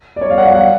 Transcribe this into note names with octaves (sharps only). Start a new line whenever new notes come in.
D5
C#5
F5
F#5
F5
F#5